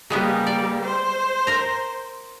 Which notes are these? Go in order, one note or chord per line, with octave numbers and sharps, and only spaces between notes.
C#3 G3 G#3 A#3 B3
D5
C5
A#4 A#5